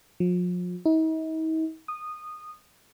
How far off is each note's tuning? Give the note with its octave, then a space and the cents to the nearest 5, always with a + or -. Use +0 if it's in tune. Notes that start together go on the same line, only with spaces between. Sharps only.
F3 +40
D#4 +45
D#6 -15